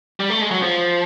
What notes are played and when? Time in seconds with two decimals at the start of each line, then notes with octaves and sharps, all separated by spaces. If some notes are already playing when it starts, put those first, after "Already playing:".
0.20 G3
0.30 A3
0.41 G#3
0.51 F#3
0.62 F3